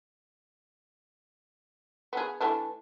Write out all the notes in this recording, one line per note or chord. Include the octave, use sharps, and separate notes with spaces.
B3 G#4
E3 A3 D4